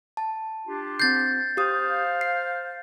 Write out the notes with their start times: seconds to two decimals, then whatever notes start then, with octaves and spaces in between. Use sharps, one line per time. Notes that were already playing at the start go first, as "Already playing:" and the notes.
0.17 A5
0.67 D4 F4 G4
1.00 C4 G6 A6 C7
1.57 G4 C5 F5 D#6
2.21 C7